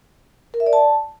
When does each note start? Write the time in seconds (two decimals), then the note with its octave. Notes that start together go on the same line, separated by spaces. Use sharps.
0.54 A#4
0.60 E5
0.66 D5
0.73 A5